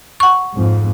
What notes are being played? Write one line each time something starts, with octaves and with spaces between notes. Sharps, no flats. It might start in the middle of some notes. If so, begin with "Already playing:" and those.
F#5 C#6
F2 G#2